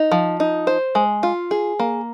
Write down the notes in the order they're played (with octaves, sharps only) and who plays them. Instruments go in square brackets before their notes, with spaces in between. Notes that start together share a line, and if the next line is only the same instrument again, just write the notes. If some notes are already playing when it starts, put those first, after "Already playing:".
Already playing: [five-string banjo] D#4
F3
D#4
C5
G#3
F4
G#4
A#3